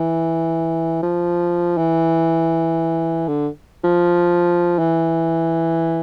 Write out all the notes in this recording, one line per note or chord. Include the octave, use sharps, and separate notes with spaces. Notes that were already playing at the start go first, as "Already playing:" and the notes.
Already playing: E3
F3
E3
D3
F3
E3